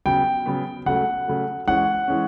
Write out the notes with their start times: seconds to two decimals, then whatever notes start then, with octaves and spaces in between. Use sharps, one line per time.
0.06 C#3 F#3 B3 G5
0.46 C#3 F#3 B3
0.86 C#3 F#3 A3 F#5
1.28 C#3 F#3 A3
1.67 E3 G#3 C#4 F#5
2.08 E3 G#3 C#4